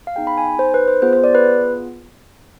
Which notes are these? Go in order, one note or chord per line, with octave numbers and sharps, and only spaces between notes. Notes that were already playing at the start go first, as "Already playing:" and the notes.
F5
B3 D#4 G#4 G5
B5
G#5
C5
B4
C5
B3 F4 G#4 C5
C5
D5
B4